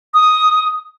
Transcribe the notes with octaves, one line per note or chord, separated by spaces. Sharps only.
D#6